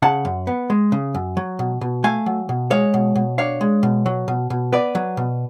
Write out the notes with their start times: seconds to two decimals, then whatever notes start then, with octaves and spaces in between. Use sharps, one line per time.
0.02 C#3 F#5 A5
0.25 F#2
0.47 B3
0.70 G#3
0.92 C#3
1.15 F#2
1.37 F#3
1.59 B2
1.81 B2
2.04 A3 F5 G#5
2.26 F#3
2.49 B2
2.71 G#3 C#5 F5
2.94 B2
3.15 B2
3.38 D4 C#5 F5
3.61 G#3
3.83 B2
4.06 F#3
4.28 B2
4.50 B2
4.72 B3 B4 D5
4.95 F#3
5.17 B2